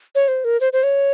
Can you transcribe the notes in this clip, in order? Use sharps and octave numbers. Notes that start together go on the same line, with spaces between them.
C#5
C5
A#4
C5
C5
C#5